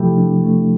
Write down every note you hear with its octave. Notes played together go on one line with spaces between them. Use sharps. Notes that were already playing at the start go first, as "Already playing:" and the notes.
Already playing: C3 F3 A3 E4 G4 A4
D4
A3